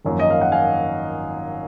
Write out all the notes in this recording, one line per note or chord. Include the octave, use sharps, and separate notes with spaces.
G#1 F#2 F3 A#3
D#5
F5
F#5
F5 G#5